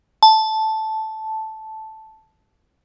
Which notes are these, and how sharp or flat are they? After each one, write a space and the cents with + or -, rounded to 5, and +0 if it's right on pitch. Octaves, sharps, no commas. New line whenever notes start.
A5 -5